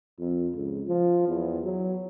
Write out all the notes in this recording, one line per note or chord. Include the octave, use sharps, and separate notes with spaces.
F2
C#2
F3
E2
F#3